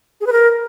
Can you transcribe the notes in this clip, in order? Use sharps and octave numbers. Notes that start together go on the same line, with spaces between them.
G#4
B4
A#4